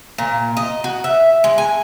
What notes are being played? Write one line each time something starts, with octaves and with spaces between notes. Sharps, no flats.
A#2
D#5
F#4
E5
G#3
G#5